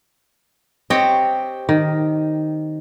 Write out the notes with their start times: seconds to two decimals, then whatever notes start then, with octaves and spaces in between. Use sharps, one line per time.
0.90 C4 G4 C#5 D#5
1.69 D#3